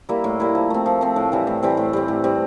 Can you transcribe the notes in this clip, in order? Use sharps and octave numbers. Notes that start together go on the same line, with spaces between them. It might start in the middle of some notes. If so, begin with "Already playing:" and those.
G3 A#3 E4
A2
G3 A#3 E4
F3
A3 C4
F3
A3 C4
A2
E3 G3 C4
A2
E3 G3 C4
A2
G3 C4
A2
G3 C4